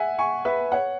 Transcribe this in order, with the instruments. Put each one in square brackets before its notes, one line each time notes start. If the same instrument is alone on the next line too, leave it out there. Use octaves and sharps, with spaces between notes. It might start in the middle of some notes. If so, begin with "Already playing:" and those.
Already playing: [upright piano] E5 F#5 G#5
G#5 C#6
B4 E5
C#5 F#5